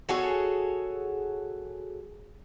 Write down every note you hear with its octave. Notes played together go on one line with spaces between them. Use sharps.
F#4 G#4 A4 C#5